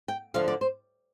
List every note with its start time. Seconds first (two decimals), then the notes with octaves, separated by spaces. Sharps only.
0.08 G5
0.34 D2 D3 F3 F5
0.48 D5
0.61 C5